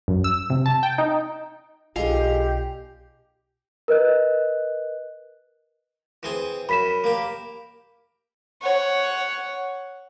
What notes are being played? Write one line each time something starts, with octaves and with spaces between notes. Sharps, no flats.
F#2
E6
C3
A5
G5
D#4
B1 D3 G#3 F4 G4 F5 G#5
A#4 B4 D#5 F#6
E3 C4 G#4
F#2 B5 B6 E7
A#3 G4
C#5 F#5